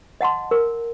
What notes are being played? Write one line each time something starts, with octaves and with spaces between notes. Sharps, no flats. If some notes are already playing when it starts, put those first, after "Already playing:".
D#5 F#5 A5 C6
A#4